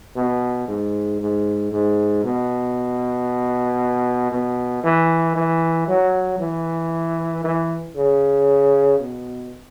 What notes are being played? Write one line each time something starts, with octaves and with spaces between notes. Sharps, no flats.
B2
G#2
G#2
G#2
B2
B2
E3
E3
F#3
E3
E3
C#3
B2